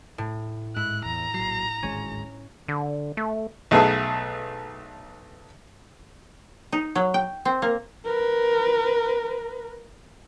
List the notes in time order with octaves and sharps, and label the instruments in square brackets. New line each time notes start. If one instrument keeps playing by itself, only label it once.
[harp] A2
[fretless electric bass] G#2 [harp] E4 [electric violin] F#6
[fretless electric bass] E2 [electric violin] A#5
[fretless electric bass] A#1 F#3 [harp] C7
[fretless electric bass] D1 G#1 G#3 [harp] C#4
[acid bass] D3
A3
[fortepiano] B1 A3 B3 G#4 A5
[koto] D#4
F#3
G5
C4
A#3
[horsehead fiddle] A#4 B4